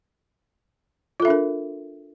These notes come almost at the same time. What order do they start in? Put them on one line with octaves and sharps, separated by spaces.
F4 A4 E5 D4 A#4